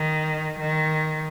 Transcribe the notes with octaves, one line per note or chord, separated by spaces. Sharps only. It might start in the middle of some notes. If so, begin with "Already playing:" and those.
Already playing: D#3
D#3